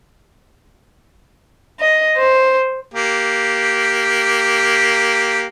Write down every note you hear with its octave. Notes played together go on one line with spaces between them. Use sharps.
D#5
C5
A#3 G4